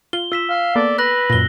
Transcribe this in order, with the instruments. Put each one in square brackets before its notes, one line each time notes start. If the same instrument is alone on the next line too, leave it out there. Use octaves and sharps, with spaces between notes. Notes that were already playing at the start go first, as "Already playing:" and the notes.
[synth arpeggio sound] F4 [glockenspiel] G7
[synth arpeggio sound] F4 [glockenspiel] E6 B6 E7
[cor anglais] F5
[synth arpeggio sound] A#3 B3 A4 [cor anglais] D5
[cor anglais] B4 [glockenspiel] F#6 A#6 F#7
[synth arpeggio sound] F#2 A#2 [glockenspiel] A#6 G7